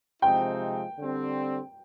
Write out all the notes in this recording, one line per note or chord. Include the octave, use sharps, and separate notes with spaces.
C3 F3 G#3 C4 D#4 G5
D3 G3 C4